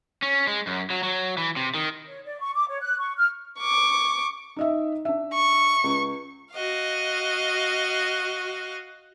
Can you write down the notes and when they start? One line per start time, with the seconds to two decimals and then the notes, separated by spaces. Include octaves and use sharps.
0.22 C#4
0.47 G#3
0.67 F#2
0.90 F#3
1.03 F#3
1.37 E3
1.56 C3
1.75 D#3
2.08 C#5
2.25 D5
2.41 C#6
2.55 D6
2.69 C#5
2.81 F#6
2.98 C#6
3.17 F6
3.60 C#6 D6
4.56 D#4 D#5 E5
5.05 D4 E5
5.34 C#6
5.84 C#2
6.54 F#4 D#5 F5